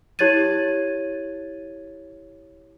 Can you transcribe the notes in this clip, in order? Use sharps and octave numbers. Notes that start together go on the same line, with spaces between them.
E4 G4 C#5 G#6 A6 D#7